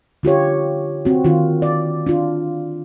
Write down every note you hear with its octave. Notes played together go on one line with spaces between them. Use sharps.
D3 F4 G4 C#5
C4 F#4
D#3 C4 F4
D5
D4 F4